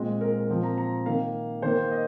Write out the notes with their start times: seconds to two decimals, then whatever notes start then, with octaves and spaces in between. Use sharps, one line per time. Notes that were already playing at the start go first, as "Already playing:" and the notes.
Already playing: A#2 G#3 C4 D#5
0.21 A#4
0.49 A#2 F3 C4
0.63 A#5
0.78 A#5
1.06 D#3 A#3 F5
1.62 D#3 A#3 C5
1.91 D#5